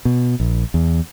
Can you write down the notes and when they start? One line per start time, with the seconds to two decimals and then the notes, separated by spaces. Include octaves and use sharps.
0.05 B2
0.40 A#1
0.74 E2